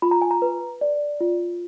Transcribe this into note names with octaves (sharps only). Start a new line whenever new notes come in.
F4 B5
A#5
G#5
A#5
B4
D5
F4